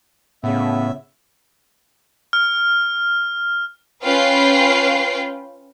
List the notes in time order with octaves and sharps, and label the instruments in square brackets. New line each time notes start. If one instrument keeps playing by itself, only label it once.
[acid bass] A2 [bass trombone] C#3 [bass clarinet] B3 [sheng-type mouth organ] E5
[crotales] F6
[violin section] C#4 F4 B4 F5 G5 C7